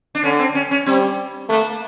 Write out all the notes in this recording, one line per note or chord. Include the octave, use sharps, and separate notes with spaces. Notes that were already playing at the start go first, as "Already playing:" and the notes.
D4
D3 C#4
C4
C#4
C#4
G3 C4
A3 A#3